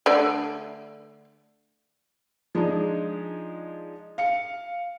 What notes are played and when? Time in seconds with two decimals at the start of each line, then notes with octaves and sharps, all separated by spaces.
0.06 D3 A3 D5
2.55 F3 G#3 D4 D#4 G#4
4.18 F5 C#7